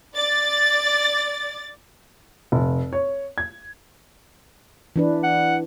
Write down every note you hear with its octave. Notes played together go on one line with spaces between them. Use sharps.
D5 A6
F1
C#5
G#6
E3 D4 B4
F#5